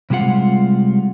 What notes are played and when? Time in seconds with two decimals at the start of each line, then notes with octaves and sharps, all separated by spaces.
0.10 C3 G3 G#3 F4 F#5